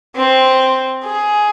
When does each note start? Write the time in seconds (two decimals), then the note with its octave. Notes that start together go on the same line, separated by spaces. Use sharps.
0.16 C4
1.04 G#4